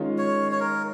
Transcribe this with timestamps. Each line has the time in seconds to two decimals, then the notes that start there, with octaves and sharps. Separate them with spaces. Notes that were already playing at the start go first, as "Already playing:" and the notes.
Already playing: D#3 G#3 C#4 F4
0.18 C#5
0.52 C#5
0.60 A#4